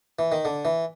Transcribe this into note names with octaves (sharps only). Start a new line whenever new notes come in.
E3
D#3
D3
E3